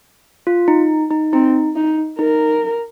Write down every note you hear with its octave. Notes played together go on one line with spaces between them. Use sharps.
F4
D#4
D#4
C4 D#4
D#4
D#4 A#4